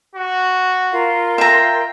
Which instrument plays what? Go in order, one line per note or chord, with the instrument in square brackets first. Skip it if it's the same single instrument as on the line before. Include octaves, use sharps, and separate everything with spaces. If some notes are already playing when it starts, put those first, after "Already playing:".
[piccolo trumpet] F#4
[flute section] F4 A#4 F5
[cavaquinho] E5 A#5 [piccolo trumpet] G5